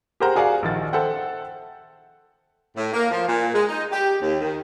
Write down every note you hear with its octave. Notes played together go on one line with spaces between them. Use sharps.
G4 G#4 A#4 C5 F#5 A#5
F#4 G#4 D5 F5 F#5
A#1 D#3 A6
A4 C5 E5 F#5 G5
A2
A#3
F3
A#2
G#3
D#4
G4
D#2
D#3